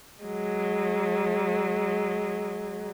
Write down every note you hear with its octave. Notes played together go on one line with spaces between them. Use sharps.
F#3 G#3